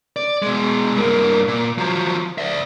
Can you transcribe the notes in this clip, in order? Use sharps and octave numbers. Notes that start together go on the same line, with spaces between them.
D5
B2 G#3
G2 A#3
A#2
F3 F#3
D5 E5